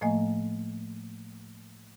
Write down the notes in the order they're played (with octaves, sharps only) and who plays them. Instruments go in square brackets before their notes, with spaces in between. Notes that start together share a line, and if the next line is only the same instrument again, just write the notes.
[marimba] A2 F3 A3 A#3 D#5 G#5